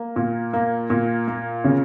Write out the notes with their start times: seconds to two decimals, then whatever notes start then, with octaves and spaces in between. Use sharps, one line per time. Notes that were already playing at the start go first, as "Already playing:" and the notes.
Already playing: A#3
0.16 A#2
0.53 A#3
0.90 A#2
1.28 A#3
1.64 C#3